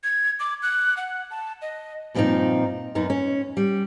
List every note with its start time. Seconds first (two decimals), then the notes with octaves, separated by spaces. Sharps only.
0.04 G#6
0.40 D6
0.63 F#6
0.97 F#5
1.31 A5
1.62 D#5
2.14 G2 A#2 F3 A3 C4 D#4
2.95 F#2 B3 D#4
3.10 C#4
3.57 G3